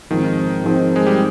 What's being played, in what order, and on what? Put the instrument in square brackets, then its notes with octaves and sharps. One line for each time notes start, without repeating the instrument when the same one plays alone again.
[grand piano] G#2 F3 C4 [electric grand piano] D#3
[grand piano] G#2 F3 C4
[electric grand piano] G#3
G3